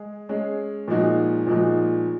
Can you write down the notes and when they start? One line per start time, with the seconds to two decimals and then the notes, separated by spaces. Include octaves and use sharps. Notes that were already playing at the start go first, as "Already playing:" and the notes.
Already playing: G#3 G#4
0.29 G#3 C#4 G#4
0.88 A#2 F3 G#3 D#4 F#4
1.47 A#2 F3 G#3 D#4 F#4